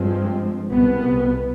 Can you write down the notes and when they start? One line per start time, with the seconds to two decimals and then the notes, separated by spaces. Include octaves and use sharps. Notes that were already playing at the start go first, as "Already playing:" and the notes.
Already playing: G2 F3 G#3 C4
0.70 C2 B2 B3